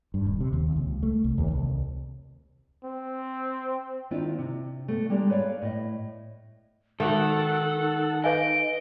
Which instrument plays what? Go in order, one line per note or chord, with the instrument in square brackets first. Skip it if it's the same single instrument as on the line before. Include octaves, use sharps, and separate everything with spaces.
[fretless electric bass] G2
D#1
C3
D#2
C#2
A3
C2
D#2
C2
[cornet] C4
[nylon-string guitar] D#3 A#3 C4 D4 E4 F4
C3
A3 B3
G3 G#3 A#3 D4 F4 G4
B4 C#5 D5 F5
A2 D#5
[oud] D#3 [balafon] G#3 F#4 [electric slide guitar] A4 [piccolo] F#5
[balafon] B4 F5 G#5 [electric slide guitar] D#5 [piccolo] D7